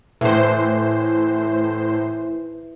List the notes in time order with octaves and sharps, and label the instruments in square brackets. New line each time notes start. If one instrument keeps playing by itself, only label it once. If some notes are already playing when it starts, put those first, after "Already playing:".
[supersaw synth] A2 C5 [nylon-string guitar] E3